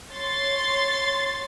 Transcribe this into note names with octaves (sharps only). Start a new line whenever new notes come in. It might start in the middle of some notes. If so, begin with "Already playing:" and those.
C#5 C6 A6